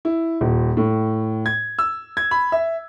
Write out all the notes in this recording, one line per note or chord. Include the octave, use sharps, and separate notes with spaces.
E4
D#1
A2
G#6
E6
G#6
B5
E5